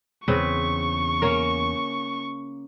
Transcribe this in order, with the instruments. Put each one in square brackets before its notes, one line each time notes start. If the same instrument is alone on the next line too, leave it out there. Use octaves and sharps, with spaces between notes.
[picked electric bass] E2 [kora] C#3 C4 B4 [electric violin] C#6
[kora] A#3 C#4 A#4